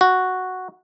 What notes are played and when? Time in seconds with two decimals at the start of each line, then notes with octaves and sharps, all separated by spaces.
0.01 F#4